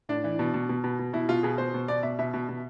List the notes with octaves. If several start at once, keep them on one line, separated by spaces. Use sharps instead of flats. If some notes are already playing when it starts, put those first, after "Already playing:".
A2 D4
E3
B2
B2
B2
B2
B2
B2 E4
B2 F4
B2 G#4
B2 C5
B2
B2 D5
B2 E5
B2 E5
B2
B2